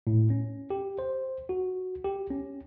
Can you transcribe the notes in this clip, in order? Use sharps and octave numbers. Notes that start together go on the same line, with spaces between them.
A2
C#4
G4
C5
F#4
G4
C#4